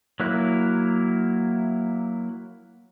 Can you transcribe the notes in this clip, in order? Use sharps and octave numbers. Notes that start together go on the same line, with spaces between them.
F#3 A#3 E4 F#6